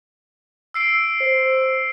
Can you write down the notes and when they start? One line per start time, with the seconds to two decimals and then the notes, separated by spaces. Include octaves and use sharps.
0.74 E6 C7 D7
1.21 C5